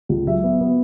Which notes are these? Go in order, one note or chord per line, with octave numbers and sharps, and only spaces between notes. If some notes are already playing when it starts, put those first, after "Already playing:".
C#2
F#3 E5
B3
B3